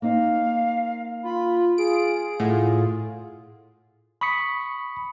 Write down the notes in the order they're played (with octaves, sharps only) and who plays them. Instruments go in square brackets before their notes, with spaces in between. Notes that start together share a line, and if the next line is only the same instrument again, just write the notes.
[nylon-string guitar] A#3 C4 D#4 [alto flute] F5
[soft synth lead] F4 [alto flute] B5
[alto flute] F4 [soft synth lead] G#4 [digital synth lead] D7
[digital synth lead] A2 [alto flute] F4 [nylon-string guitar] F#5
[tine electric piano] B5 C#6 D#6 B6 C#7